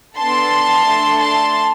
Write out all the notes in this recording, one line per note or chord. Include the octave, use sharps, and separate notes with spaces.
B3 D4 A4 A5 C6
A3 D4 A4
A5 C6